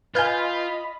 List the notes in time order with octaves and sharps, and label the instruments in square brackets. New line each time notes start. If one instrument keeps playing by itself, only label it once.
[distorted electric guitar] F4 [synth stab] B4 F5 G#5 [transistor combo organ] D#5 B5 [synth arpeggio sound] F6 G6